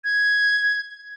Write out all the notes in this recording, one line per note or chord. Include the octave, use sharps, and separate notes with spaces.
G#6